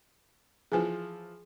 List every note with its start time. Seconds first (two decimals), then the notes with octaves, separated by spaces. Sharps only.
0.72 E3 F3 G#4 G#5